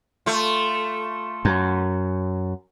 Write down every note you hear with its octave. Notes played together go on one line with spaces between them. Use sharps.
A3 F4
F#2